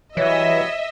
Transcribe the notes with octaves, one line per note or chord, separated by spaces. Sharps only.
E3 F#3 G3 E4 C#5 D#5 E5